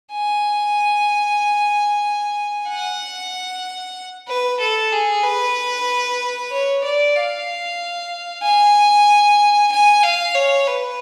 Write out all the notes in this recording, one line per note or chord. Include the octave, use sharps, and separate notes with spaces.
G#5
F#5
B4
A4
G#4
B4
C#5
D5
F5
G#5
G#5
F5
C#5
B4